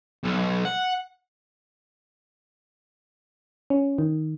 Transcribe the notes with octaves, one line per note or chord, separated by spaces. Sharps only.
B1
F#5
C#4
D#3